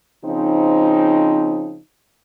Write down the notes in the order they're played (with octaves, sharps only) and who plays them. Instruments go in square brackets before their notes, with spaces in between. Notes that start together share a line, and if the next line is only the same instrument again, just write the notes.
[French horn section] C#3 F3 C4 D#4